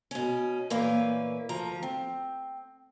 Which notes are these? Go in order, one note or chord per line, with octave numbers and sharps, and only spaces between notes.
B2 C#4
A#2 E3 A#3 C#4 B4 F5
D2 F3 A#5
C4